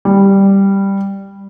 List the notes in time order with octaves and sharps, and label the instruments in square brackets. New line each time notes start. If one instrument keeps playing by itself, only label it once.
[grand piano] G3